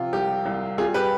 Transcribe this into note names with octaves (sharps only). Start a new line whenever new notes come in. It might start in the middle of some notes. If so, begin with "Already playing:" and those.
Already playing: C3 F3 F4
C2 G4
C2
G3 F4 G#4
G4 B4